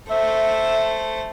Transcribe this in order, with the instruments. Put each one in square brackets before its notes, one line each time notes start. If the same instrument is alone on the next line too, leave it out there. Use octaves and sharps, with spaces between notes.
[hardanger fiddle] A3 C5 [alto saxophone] E5